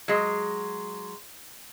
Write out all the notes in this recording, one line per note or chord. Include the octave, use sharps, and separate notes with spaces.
F#3 G#3